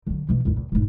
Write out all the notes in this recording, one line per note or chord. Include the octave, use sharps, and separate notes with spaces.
D3 F#3
B2 E3
A1 D#2
E2
E1 G#2